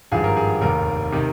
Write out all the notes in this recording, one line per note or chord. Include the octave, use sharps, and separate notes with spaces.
G#1 G2 F3 G#4
A#4
G#4
F1 D#2 D#3 A#4
C3 D#3